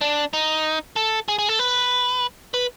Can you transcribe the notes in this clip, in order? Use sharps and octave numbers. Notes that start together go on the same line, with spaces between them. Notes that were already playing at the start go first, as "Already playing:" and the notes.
D4
D#4
A4
G#4
G#4
A4
B4
B4